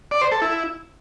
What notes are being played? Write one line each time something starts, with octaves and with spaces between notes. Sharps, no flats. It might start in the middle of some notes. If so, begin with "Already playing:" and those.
D5
C5
A4
E4